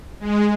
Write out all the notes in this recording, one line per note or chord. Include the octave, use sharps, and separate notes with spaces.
G#3